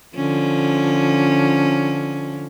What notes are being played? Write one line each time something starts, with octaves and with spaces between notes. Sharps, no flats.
D3 F3 C#4